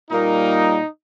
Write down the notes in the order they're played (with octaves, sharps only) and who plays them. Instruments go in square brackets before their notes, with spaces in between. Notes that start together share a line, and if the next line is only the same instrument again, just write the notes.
[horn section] A#2 G3 A#3 D#4